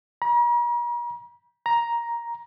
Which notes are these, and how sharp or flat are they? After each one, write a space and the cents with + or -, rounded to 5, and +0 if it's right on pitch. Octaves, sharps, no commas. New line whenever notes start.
A#5 +45
A#5 +10